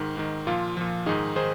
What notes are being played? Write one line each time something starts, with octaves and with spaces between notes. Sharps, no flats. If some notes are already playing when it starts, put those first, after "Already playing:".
Already playing: G#2 D#3
G#2 D#3
A#2 F3 F4
A#2 F3
G#2 D#3 D#4 G#4
D#3 G#4 C5